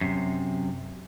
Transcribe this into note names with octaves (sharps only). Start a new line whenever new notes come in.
F#2 C3